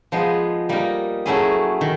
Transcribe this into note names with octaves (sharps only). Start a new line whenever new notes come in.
F3 G#3 B3 D#4 G#4
G3 A#3 D#4
F#3 A3 C#4 E4 G#4
D#3